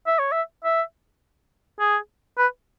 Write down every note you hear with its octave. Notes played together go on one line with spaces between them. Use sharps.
E5
C#5
E5
E5
G#4
B4